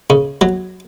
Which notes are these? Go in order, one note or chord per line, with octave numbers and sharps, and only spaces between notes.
C#3
F#3